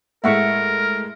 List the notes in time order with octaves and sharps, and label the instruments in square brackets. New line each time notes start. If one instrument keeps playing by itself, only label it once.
[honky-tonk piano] A2 G#3 A3 [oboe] A#4 [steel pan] E5 F#5 C#6